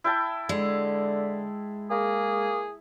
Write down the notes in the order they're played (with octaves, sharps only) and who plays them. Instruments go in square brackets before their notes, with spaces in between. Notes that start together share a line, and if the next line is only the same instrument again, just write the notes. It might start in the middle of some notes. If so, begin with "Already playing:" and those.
[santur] E4 G5 A5
[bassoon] D3 [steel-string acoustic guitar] G#3
[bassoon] A#3 [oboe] G#4